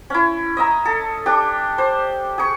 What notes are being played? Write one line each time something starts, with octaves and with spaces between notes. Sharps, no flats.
C#4 E4
D#5 E5 A#5
A4
D4 G4
C5
G#4 C#6